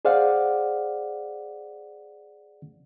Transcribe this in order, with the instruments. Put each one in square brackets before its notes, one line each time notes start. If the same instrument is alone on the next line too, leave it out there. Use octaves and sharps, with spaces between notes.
[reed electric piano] G#4 C5 D5 F5 F#5